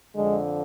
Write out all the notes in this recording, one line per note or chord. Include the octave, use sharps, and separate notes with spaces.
F2 D3 G#3